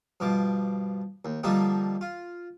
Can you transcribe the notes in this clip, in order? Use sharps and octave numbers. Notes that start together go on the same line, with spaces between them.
G2 B2 F3 D6
D#2
D3 F3 G3 A#3 D4 D#4
F4